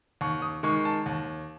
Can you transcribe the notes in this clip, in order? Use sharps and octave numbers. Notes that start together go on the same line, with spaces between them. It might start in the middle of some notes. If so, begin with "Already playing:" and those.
D#2 C#6
D#6
D#3 G#3 C#6
A5
D#2